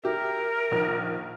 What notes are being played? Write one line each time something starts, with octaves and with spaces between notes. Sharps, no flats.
G4 A#4 E5
A#1 D#3 F6